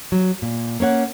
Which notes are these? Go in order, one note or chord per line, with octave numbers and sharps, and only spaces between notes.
F#3
A#2
A#3 C#4 C#5 F#5